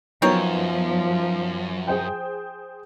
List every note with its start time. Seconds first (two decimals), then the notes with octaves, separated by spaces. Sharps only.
0.22 F#2 F3 F#3 B3 C4 D#4 A#4 C#5
1.87 G#4 C5 G5